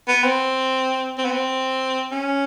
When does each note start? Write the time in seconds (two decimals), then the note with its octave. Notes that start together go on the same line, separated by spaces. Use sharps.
0.08 B3
0.24 C4
1.18 C4
1.25 B3
1.32 C4
2.12 C#4